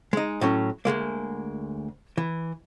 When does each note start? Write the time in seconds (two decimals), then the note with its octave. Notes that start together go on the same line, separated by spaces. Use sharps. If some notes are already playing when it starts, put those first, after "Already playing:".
0.13 G#3 D#4
0.41 A2 F#3 C#4
0.85 D2 A#2 G#3 A#3
2.18 E3